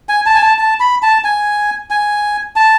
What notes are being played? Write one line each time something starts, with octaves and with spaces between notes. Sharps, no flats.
G#5
A5
G#5
A5
A5
B5
A5
G#5
G#5
A5